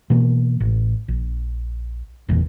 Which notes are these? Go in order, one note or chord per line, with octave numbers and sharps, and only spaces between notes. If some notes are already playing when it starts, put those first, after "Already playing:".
B2 E3 A#3
A1
A#1
F#1 E2 A#2